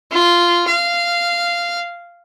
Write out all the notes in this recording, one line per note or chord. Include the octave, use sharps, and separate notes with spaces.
F4
F5